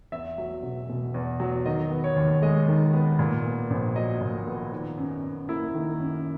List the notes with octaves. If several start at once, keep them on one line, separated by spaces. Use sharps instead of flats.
E2 E5
F#3
E1
B2
E2
F#3
D#3 D#5
B3
C#5
D#2
G#3 D#5
D#3
B3
A#2
B3
A#1
F#3 D#5
A#2
B3
D#3
F#2
F#2
A#3 E4
D#3
F#2